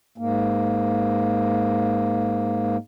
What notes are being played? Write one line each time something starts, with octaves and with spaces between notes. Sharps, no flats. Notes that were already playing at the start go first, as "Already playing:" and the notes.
G#2 A#3